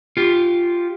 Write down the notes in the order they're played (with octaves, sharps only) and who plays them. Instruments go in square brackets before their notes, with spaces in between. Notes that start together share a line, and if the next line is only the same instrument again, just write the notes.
[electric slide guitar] F4 G4